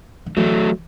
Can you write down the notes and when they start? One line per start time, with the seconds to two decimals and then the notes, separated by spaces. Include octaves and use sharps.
0.26 D3
0.37 E3 F#3 A3